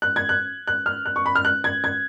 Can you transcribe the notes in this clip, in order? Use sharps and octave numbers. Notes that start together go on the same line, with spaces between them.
F#6
G#6
F#6
F#6
F6
F#6
C#6
B5
F6
F#6
G#6
G#6